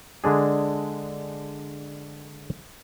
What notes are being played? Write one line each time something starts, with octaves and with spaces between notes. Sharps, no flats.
D3 G#3 D4 G#4